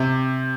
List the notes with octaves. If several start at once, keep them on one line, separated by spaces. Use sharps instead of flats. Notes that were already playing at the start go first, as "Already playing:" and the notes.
Already playing: C3